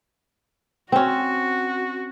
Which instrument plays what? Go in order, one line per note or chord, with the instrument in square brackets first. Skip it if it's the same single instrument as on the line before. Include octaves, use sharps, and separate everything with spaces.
[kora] C4 C#4 [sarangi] F#4